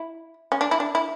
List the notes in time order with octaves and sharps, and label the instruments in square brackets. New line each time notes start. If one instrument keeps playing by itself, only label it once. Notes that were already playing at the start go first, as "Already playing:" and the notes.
Already playing: [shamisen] E4
C#4
D4
E4
D4
E4